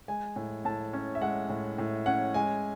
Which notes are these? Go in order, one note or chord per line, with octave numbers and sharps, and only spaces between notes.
G#3 G#5
A2
A2 A5
C#4
E5
G#3 F#5
A2
A2
C#4 F#5
G#3 G#5